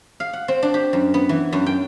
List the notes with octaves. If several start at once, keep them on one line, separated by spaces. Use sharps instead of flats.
F5
F#5
C4
D4
G4
F#2
B3
E3
F#2
G5